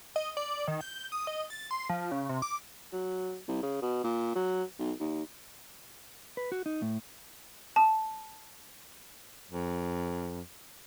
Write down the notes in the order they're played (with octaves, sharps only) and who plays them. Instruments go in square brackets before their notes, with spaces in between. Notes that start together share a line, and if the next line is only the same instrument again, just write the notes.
[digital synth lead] D#5
D5
D#3
G6
D#6
D#5
A6
C6
F3
C#3
C3
D6
[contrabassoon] F#3
C2
C#3
B2
A#2
F#3
B1
D#2
[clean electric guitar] B4
F#4
D#4
A2
[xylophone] A5
[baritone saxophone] F2